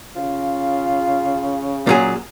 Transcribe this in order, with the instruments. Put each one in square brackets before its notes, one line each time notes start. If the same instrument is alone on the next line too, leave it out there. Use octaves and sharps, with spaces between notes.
[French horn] C#3 [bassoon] F4
[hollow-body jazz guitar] A#2 F#3 G#4